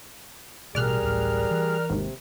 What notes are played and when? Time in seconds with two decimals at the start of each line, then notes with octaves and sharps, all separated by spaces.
0.75 A1 B2 G3 G#4 A#4 D5 F6 F#6
1.02 D1 A1
1.51 E3
1.90 G#1 D#2 G#2 C3